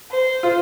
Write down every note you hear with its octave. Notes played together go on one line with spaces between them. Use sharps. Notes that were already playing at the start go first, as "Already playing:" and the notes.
C5
F4